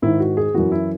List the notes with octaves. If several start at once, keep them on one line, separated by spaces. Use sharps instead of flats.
G#2 D#3 E4
F#4
G#4
F#2 E3 F#4
E4